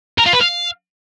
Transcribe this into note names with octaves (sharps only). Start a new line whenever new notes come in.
A#4
F4
B4
F5